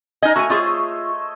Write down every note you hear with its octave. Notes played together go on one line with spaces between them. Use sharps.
D#4 A#4 D#5 G#5
A3 F#4 G#5
F4 G#4 C5 C#5 D#5